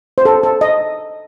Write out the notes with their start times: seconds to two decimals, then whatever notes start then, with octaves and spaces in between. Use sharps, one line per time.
0.18 C5
0.25 A4
0.43 A4
0.61 D#5